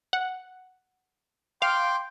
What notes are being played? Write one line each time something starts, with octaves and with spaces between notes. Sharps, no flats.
F#5
F5 G5 C6 D6